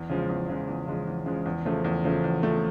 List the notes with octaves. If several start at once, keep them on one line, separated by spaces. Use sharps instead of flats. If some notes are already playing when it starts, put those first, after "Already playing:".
Already playing: E2
C#3 F3 G#3
E2
C#3 F3 G#3
E2
C#3 F3 G#3
E2
C#3 F3 G#3
E2
C#3 F3 A3
E2
C#3 F3 A3
E2
C#3 F3 A3